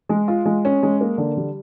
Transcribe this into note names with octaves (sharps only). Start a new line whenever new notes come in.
G#3
F4
G#3
C#4
G#3
A#3
D3
G3